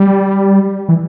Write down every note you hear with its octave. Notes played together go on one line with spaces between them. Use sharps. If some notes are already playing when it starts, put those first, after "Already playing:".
Already playing: G3
E3